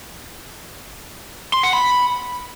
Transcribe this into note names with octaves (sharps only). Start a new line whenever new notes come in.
C6
F#5
B5